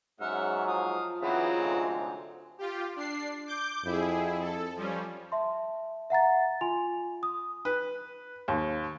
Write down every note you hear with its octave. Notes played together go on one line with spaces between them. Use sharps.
G#2 C#3 F#3 E5 F#5 F6
F3 F4 F5 D#6
C#3 E3 F#3 B3 C4 D#4
D2 G#2 C3
F4 G4
D4 C7
D6 G6
F2 E4 G#4
A4
F3 G3 C#4
E5 A5 C6
E5 F#5 A#5 A6
F4 G#5 C6 F7
D#6
B4
D#2